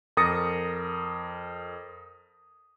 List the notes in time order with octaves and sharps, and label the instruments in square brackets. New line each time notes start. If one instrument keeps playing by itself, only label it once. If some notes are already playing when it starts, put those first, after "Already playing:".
[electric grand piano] F2 A#4 D#6 A6 A#6 C#7